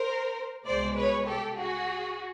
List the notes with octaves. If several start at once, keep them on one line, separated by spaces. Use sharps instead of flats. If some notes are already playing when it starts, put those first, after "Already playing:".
Already playing: A#4 C5
C2 B2 G#3 C5 D5
B4 C#5
G4 A4
F#4 G#4